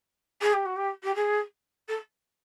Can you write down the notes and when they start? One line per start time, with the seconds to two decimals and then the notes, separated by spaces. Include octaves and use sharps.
0.41 G#4
0.53 G4
0.65 F#4
0.76 G4
1.03 G4
1.15 G#4
1.88 A4